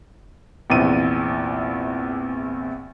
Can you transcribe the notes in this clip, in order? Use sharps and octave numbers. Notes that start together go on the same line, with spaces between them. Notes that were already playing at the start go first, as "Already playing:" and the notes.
A#1 E2 C3 D#7